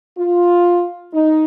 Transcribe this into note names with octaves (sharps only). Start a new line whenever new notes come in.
F4
D#4